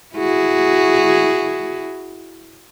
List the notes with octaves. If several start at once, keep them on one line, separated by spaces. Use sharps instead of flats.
E4 F#4 G#4